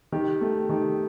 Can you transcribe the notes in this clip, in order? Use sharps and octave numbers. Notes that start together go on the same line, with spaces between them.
D#3 G4
A3
D#3 G4